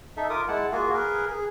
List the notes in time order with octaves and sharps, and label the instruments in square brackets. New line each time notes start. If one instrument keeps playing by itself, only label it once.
[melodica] D#4 A4 E5
F4 A#4 D6 D#6
G#3 E4 F#5 A5
A#3 F4 F#4 G#4
G#4 A#4 B4
G#4